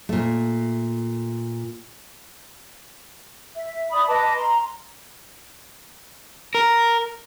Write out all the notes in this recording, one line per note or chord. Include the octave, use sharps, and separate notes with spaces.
A#2 A3
E5
D5 E5 B5 D#6
B4 D#5 A5 D6
A#5 C6
A#4